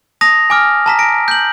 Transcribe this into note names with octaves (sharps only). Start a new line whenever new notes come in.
A5 D#6 A#6 F7
G#5 D6 F6
A5 A#5 B6
A#6 D7
G6 F#7